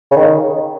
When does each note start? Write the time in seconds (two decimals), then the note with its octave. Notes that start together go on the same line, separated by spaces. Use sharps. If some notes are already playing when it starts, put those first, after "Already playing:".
0.11 C#3
0.16 D#3